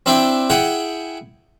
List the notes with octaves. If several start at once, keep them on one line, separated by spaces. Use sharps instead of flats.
C4 D4 E4 E5 G5
E4 G#4 F#5 G5